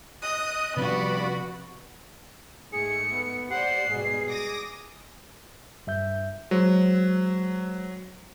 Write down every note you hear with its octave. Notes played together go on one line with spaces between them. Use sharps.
D#5 D#6 F#6
G2 C3 F3 B3 C4 F#4 D5 B5
G#2 A3 G#4 C#7
B3
G4 C5 D5 F#5 C7
G#2 B2 G3 G#4
D6 D#6 A#6
G2 E5 G6
F#3 G#3 C5